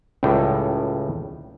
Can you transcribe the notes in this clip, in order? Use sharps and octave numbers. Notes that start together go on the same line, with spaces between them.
C#2 A2 G3